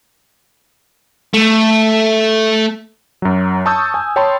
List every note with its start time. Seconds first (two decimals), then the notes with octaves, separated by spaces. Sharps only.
1.34 A3
3.22 F#2 F#3
3.66 A5 C#6 D#6 E6 G6
3.94 G#5
4.16 C#5 G5 A5 B5 C6